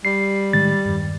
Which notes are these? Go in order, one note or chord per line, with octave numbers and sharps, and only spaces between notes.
G3 C7
A2 D#3 G#3 A6
E2 G2 D#3